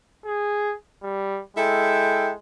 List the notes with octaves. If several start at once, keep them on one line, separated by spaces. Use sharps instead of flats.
G#4
G3
G#3 E4 A4 G5